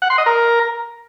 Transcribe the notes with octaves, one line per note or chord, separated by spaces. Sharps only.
F#5
C6
D#5
A#4